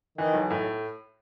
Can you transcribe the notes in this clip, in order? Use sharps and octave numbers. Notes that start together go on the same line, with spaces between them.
D#3 E3
B1
A2